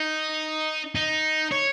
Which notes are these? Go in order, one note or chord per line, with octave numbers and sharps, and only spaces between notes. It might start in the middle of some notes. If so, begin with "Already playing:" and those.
Already playing: D#4
D#4
C#5